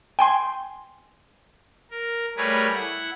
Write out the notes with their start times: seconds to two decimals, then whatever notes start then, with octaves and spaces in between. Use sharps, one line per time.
0.19 G5 G#5 C6
1.91 A#4
2.37 G3 A3 G#4 A#4 B4 C#5
2.74 E4 F#5